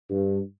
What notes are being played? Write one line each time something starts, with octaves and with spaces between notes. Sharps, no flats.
G2